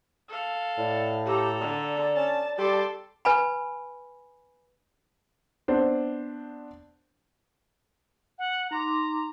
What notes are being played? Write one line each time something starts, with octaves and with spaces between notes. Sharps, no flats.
A4 F5
A2 D5
G4 A4 A#5
D3 D5
C#4 A5
G3 A4 C6 D6
B4 G#5 B5
B3 C4 D4 C5
F#5
D#4 A#5 C6 D6